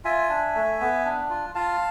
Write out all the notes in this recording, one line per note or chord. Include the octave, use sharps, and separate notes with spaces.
F4 E5 G#5
D4
A3
B3
D4
F4
F4 F5 A5